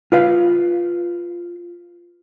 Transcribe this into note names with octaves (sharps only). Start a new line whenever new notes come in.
F4 B4 F5